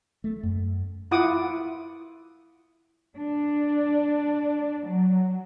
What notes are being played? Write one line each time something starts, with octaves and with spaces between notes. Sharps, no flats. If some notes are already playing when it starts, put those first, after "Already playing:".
A3
F#2
E4 F4 F#5 D6 D#6
D4
F#3